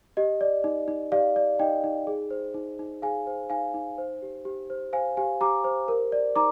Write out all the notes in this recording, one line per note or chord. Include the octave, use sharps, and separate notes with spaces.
G4 D#5
D5
D#4
D#4
G4 D5 F5
D5
D#4 D#5 G5
D#4
G#4
C5
D#4
D#4
G#4 F5 G#5
C5
D#4 F5 G#5
D#4
C5
G4
G4
C5
C5 F5 G#5
G4 F5 G#5
G4 A#5 D6
C5
A#4
D5
D#4 A#5 D6